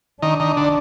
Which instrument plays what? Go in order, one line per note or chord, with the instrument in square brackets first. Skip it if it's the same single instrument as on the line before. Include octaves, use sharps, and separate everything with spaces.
[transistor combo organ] D#3 [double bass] D4
[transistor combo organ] D#3
D3